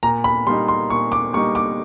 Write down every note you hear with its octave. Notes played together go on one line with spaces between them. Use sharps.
A#2 A#5
B5
G3 A#3 D#4 C6
C6
A#2 C#6
D6
G3 A#3 D#4 C#6
D6